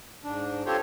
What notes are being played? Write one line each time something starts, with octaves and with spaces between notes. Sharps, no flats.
G#2 D4
C4 F4 G4 A4 C5 C#5